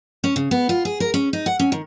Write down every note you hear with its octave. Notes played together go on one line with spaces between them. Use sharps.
C#4
C#3
B3
F4
G#4
A#4
C#4
D#4
F#5
C#4
D#3